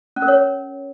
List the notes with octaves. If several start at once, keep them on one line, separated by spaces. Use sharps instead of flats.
C#4
A#4
C#5